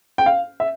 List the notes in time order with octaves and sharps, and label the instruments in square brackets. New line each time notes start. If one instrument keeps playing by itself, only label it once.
[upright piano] G5
F5
E5